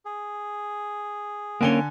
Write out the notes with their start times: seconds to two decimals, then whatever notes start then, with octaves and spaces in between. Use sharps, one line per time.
0.05 G#4
1.61 D3 A#3 C4 C#4 G#5 G7